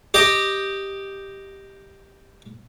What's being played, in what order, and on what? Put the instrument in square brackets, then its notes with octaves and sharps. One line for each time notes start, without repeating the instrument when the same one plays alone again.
[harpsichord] G4 D#5